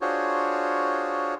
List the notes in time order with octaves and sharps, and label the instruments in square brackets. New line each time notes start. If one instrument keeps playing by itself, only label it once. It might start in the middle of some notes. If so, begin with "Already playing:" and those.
[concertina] D4 F4 F#4 G#4 C5 C#5